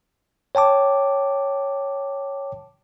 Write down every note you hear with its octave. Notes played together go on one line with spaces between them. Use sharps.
C#5 G5 A5 D6